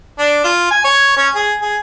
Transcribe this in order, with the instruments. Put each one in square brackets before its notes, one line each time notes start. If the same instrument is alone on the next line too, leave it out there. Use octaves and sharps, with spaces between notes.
[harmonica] D4
F4
G#5
C#5
C#4
G#4
G#4